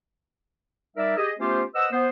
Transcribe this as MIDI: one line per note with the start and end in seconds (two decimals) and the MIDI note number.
0.97 1.13 55
0.97 1.13 63
0.97 1.13 70
0.97 1.13 74
0.97 1.13 76
1.16 1.31 67
1.16 1.31 68
1.16 1.31 75
1.39 1.62 57
1.39 1.62 59
1.39 1.62 61
1.39 1.62 65
1.39 1.62 67
1.39 1.62 72
1.75 1.87 71
1.75 1.87 72
1.75 1.87 75
1.75 1.87 78
1.75 1.87 88
1.92 2.08 59
1.92 2.08 72